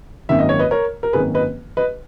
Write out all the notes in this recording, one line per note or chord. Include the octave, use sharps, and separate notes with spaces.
G#1 F#2 D#3 A#3 C#4 E5
D#5
C#5
B4 D#5
A#4 C#5
A#4
G#1 F#2 D#3 A#3 C#4 G#4 B4
B4 D#5
B4 D#5